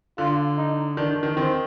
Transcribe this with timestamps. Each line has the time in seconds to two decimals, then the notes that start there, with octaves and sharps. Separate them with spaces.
0.18 D3 F4
0.58 D#4
0.97 D#3 D4
1.11 D#3
1.23 D#3
1.36 D#3 C4